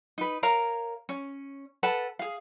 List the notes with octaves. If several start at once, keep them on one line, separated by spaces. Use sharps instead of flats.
D#4 B4
A#4 C#5 F5 A#5
C#4
A4 B4 F#5 A5
G#4 F5